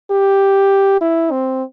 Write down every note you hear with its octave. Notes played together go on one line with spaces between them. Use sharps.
G4
E4
C4